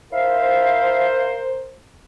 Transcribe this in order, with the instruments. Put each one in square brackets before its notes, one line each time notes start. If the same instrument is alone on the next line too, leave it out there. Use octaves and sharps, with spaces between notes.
[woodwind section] E4 E5 F5 [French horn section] A#4 C5